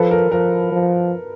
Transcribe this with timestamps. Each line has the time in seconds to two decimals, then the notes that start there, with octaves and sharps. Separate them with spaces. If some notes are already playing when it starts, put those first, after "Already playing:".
Already playing: F3 A4 B4
0.11 A#4
0.31 F3 A#4
0.72 F3